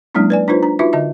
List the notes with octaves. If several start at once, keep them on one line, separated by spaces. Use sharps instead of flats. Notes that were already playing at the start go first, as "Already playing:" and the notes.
F#3 G#3 A#3 C#4 D4 E4
B4 D5 G#5
D4 D#4 F4 B4 C5
D4 A#5
D#4 F4 F#4 B4 E5
D3 D#5 E5